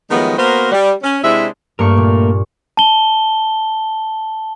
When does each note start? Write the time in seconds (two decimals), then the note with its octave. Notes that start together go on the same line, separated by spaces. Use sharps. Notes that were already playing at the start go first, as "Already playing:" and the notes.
0.10 D#3 F3 F#3 G#3 A3 B3
0.38 A#3 B3 F#4 A#4 C5
0.72 G3
1.02 C#4
1.23 C3 G#3 D4 E4 C5 E5
1.79 G2 A3 A#3 A#4 C#6
1.97 A#2
2.77 A5 G7